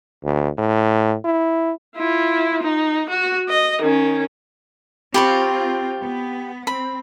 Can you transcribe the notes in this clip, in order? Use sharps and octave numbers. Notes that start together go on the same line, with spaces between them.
D2
A2
E4
E4 F4
D#4
F#4
D#5
D#3 C#4
C4 F4 G4 B5 C#6
B3
C4 B5